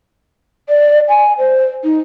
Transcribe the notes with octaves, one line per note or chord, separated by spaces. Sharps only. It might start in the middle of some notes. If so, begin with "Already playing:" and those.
D5
G#5
C5
D#4